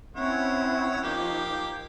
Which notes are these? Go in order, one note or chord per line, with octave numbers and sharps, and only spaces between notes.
C4 C#4 E4 C#5 F#5
F3 A#3 D#4 G4